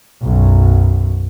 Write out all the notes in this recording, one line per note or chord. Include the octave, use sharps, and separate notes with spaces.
B1 F#2